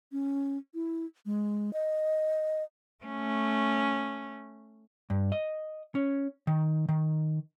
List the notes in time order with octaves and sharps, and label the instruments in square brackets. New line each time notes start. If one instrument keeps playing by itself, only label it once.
[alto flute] C#4
E4
G#3
D#5
[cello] A3 C#4
[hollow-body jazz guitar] G2
D#5
C#4
D#3
D#3